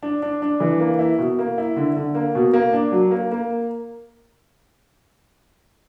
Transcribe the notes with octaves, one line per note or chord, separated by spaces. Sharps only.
D4
D4
D4
E3
A#3
E4
B2
A#3
E4
D3
D3
A#3
B2
A#3
D4
F#3
A#3
A#3